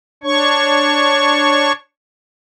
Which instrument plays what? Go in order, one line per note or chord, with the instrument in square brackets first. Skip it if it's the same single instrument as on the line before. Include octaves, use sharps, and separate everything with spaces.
[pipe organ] D4 C#5 C#6